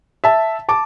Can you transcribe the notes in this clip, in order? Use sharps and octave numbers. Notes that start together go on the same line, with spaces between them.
E5 A5
A5 D6